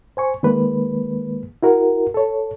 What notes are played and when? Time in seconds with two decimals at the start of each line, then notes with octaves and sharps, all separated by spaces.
0.17 C5 G#5 C#6
0.43 D#3 G#3 A#3 B4
1.63 E4 F#4 A#4
2.14 A4 C#5